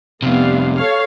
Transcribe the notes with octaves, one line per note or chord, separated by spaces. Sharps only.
F2 C3 G3 B3 F5
A4 C#5 F5